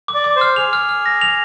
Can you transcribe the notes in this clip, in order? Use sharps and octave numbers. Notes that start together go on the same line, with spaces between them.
D6
D5
D6
C5
F6
G#4 F7
F6
F6
A#6
F7